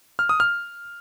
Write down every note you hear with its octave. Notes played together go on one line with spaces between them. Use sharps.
F6
D#6
F6